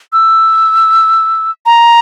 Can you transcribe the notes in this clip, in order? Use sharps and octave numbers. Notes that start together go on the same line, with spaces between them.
E6
A#5